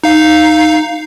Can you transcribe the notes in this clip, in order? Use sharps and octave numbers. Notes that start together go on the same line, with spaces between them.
D#4 F5